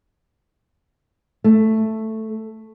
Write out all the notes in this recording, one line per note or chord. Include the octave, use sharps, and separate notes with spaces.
A3